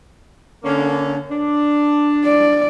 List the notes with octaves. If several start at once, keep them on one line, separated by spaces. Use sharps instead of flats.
D3 A#3 C#4
D4
D5